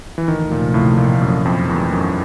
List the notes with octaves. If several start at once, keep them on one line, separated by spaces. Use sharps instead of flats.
E3
D2 C3 D#3 F3 A3
A#2
A2
A#2
F#2
F2
E2
F#2